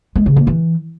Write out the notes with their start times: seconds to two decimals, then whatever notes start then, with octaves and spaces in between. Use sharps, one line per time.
0.16 G#3
0.26 C#3
0.36 A#3
0.47 E3